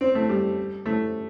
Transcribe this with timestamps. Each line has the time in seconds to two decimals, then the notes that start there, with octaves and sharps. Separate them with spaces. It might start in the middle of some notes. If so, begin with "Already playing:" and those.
0.01 C4
0.15 A3
0.29 G3
0.86 A3